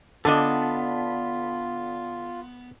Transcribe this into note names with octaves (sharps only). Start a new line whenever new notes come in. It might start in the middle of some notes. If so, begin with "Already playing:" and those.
D3 B3 D4 F4 A4 D#5